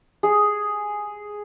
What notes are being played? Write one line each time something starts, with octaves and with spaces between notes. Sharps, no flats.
G#4